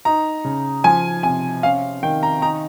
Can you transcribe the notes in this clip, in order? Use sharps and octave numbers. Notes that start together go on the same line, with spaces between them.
D#4 A#5
C#3
F3 G#5
C3 G#5
C#4 F5
D#3 G5
A#5
D#4 A#5